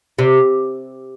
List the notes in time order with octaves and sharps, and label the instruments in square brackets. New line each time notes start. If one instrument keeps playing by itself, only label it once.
[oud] C3